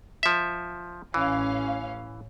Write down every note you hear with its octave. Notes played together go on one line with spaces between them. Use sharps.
F3 E5
A1 E3 C#4 F5